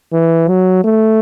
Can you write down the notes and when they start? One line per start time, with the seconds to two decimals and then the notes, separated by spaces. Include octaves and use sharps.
0.13 E3
0.48 F#3
0.85 A3